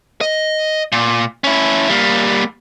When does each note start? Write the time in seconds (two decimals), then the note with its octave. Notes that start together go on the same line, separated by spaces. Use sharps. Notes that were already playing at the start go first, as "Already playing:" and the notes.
0.21 D#5
0.92 A#2
1.44 C#4 E4
1.90 G3 A#3